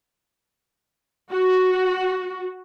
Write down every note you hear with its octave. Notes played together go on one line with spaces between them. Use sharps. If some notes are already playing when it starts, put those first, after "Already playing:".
F#4